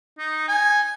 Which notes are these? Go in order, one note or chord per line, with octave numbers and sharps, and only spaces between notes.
D#4
G#5